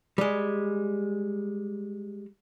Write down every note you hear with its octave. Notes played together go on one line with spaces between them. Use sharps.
G3 G#3